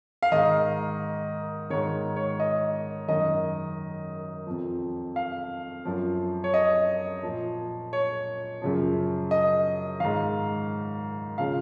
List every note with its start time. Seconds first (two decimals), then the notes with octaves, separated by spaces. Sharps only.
0.22 F5
0.32 G#2 D#3 D#5
1.70 G#2 D#3 C#5
2.16 C#5
2.40 D#5
3.08 F#2 D#3 D#5
4.47 F2 F3
5.16 F5
5.85 F#2 F3
6.44 C#5
6.54 D#5
7.23 A#2 F3
7.93 C#5
8.62 F#2 C#3 F3
9.31 D#5
10.00 G#2 D#3 F5
11.38 C#3 F3 F5